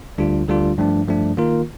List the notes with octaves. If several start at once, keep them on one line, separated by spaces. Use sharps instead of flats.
D2 D3 G3 D4 F4
D2 D3 G3 D4 F4
G2 F3 A3 D4
G2 F3 A3 D4
D#3 A#3 F4 A#4